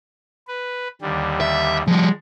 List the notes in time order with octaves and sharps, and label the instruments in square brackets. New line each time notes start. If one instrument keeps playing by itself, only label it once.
[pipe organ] B4
D#2 D3 G3
[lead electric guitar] E5
[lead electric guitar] F3 G3 [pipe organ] G#3